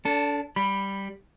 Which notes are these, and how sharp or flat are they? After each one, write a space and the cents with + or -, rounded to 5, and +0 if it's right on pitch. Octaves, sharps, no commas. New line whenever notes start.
D4 -30 A4 +5
G3 +0 B5 +0